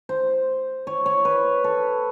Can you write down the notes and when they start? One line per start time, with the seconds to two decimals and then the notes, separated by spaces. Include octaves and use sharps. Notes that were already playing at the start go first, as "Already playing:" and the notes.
0.09 C5
0.87 C#5
1.06 C#5
1.25 B4
1.64 A4